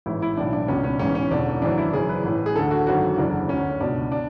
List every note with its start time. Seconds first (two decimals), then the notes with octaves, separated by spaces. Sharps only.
0.06 A1 G#2 E3 E4
0.22 E4
0.37 B1 A2 E3 D4
0.53 D4
0.68 C#2 B2 C#4
0.84 C#4
0.99 A1 G#2 E3 C#4
1.15 C#4
1.31 E1 E2 D3 D4
1.62 G#1 F#2 E3 D4
1.78 E4
1.93 F#1 F#2 E3 G#4
2.09 B4
2.24 A1 A2 E3
2.46 G#4
2.55 D2 D3 A4
2.71 F#4
2.86 G#1 F#2 D3 F#4
3.18 F#1 E2 C#3 D4
3.49 D2 D3 C#4
3.80 C#2 B2 D4
4.12 D4